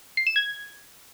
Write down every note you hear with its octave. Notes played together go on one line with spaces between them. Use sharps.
C7
E7
G#6